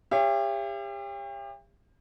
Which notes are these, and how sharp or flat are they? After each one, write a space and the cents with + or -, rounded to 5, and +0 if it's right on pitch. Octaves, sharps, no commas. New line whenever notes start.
G4 +35 C#5 +0 E5 +45